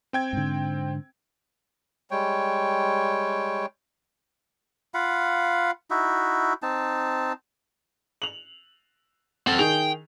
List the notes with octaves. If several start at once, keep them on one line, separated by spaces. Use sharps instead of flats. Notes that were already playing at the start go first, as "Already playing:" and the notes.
C4 G5 G#6
G#2 D3
G3 G#3 C#5 G5
F4 F5 F#5 B5
D#4 E4 F#4 E5
C4 D#4 A5
F7 F#7
C4 A4 F#5
D#3 G#4 G5 F7